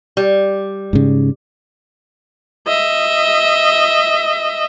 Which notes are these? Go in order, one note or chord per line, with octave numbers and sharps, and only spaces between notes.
G3
G#2 C#3
D#5 E5